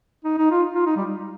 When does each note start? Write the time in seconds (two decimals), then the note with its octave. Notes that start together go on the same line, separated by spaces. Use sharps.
0.25 D#4
0.38 D#4
0.51 F4
0.75 F4
0.86 D#4
0.96 G3